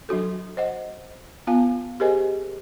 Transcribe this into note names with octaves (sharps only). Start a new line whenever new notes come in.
F#3 D4 F#4 A4
C5 D#5 F#5
B3 F4 F5 G#5
G4 G#4 A#4 C5 D#5 G#5